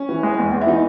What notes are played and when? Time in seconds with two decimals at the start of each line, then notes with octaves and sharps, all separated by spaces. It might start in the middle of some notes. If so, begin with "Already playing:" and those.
Already playing: C#4
0.09 E3
0.23 G#3
0.38 E2
0.52 E2
0.61 E4
0.67 E3 D#4